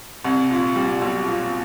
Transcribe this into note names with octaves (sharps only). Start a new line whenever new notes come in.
C2
A#2
G3
B1
A#2